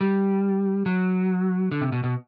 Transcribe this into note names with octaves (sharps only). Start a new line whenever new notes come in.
G3
F#3
D3
C3
B2
B2